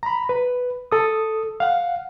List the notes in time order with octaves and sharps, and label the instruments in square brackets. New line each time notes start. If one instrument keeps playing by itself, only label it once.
[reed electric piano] A#5 B5
B4
A4 D#6
F5 F#5